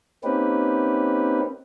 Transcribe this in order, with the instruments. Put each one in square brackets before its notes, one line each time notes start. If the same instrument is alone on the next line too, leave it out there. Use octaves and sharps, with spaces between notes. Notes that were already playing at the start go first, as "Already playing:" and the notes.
[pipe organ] A#3 C4 C#4 D#4 G4 B4